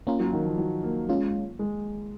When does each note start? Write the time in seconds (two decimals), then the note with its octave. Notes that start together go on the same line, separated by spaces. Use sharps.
0.07 A#3 C#4 F4 A#4
0.20 F#3
0.33 D#3
0.45 F3
0.58 F#3
0.83 A#3
1.09 G#3 C#4 F4
1.59 G#3